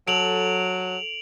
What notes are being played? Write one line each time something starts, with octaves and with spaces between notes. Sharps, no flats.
F#3 A4 D7 F7 F#7